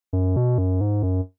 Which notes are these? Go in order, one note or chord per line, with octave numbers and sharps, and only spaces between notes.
F#2
B2
F#2
G#2
F#2